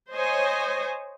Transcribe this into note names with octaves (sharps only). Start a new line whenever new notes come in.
C5 C#5 D#5 G#5